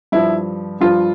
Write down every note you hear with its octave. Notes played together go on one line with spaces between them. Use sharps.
G2 F3 E4
G2 F3 F4